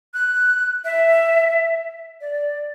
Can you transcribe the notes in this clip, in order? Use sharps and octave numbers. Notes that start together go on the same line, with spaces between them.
F#6
E5
D5